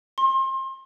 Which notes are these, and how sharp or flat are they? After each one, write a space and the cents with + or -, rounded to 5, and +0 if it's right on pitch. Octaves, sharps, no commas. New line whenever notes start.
C6 +30